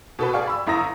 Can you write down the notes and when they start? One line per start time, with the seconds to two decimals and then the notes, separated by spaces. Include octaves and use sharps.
0.19 B2 A4 B4
0.33 G#4 D5 F5 G5 C#6
0.47 B5 E6
0.66 G1 E4 A#5 D#6 A#6